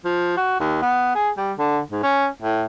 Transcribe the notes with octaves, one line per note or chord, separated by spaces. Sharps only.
F3
F#4
D#2
B3
G#4
G3
D3
G#2
C#4
A2